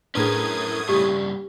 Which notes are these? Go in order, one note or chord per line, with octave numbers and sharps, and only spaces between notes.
A2 C#4 D4 G#4 A#4 B4 D#6 G#6
G2 C#3 G4